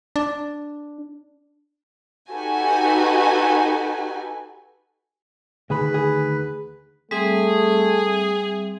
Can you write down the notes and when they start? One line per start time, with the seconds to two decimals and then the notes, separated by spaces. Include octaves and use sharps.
0.16 D4
2.31 D#4 F#4 G4 A4 B4 G#5
5.70 D2 D#3 G#4 B4 B5
5.94 G#4
7.11 G3 A3 C4 G#4 E5